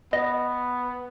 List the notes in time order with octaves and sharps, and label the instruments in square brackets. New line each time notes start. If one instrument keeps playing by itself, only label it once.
[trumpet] B3 [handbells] D#5